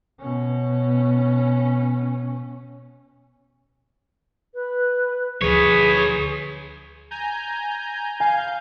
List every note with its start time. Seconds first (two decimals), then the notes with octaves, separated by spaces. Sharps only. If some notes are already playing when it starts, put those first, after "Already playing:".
0.20 B2 C#4
4.54 B4
5.41 D2 D3 F3 G#4 B4 C#5
7.11 G#5 A#5 G6
8.20 F5 G#5 G6